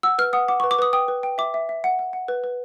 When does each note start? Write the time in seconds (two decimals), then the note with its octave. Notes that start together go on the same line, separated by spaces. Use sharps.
0.03 F#5 E6
0.18 B4 F6
0.33 F#5 D#6
0.48 F#5 D6
0.60 C#6
0.64 B4
0.71 D6
0.79 B4 D#6
0.93 G5 D#6
1.08 B4
1.23 G5
1.38 E5 D6
1.54 E5
1.69 E5
1.84 F#5
1.99 F#5
2.13 F#5
2.28 B4
2.44 B4